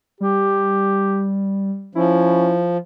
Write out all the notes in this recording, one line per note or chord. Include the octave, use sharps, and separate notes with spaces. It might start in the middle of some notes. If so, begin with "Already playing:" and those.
G3 G4
F3 C#4 E4